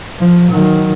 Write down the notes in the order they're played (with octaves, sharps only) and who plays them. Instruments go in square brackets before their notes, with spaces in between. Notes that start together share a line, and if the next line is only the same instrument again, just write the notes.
[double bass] F3
D#3 F#3